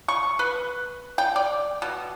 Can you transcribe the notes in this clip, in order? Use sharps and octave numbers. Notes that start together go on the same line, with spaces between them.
C#6
B4
G5
D5
B2